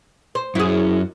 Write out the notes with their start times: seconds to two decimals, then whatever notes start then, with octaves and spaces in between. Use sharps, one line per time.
0.35 C5
0.55 F#2 E4 G#4